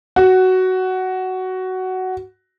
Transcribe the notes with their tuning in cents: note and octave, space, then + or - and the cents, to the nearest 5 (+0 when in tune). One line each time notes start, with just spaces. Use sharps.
F#4 +10